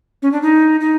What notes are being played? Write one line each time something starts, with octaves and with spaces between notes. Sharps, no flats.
C#4
D4
D#4
D#4